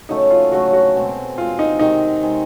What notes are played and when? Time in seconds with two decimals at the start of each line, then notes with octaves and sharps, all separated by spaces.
0.09 C#3 F#3 A3 D#4
0.30 F4
0.51 C#3 F#3 A3 F#4
0.73 F#4
0.95 B2 G#3 C4
1.37 B2 G#3 C4 F4
1.59 D#4
1.79 C3 D#3 G#3 D#4
2.23 C3 D#3 G#3